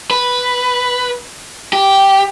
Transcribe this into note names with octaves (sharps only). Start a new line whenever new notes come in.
B4
G4